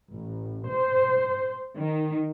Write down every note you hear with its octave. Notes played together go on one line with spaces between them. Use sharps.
A1
C5
D#3